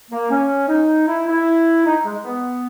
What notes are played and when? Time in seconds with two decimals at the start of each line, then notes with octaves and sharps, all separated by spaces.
0.11 A#3
0.30 C#4
0.69 D#4
1.07 E4
1.27 E4
1.85 D#4
2.05 G#3
2.25 B3